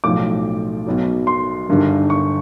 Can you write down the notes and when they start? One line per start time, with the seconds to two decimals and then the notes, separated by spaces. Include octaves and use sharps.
0.04 B1 A2 F3 D6
0.87 B1 B2 F#3
1.27 C6
1.69 G1 G2 D#3
2.10 C#6